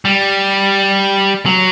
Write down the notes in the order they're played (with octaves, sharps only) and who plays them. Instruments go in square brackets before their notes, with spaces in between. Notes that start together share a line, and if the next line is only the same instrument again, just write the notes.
[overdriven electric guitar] G3
F#3